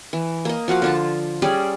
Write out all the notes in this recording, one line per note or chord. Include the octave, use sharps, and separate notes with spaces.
E3
A#3 D#5
F3 F#4 F5 F#5
D3 F4 A5
G3 C#4 G#4 D5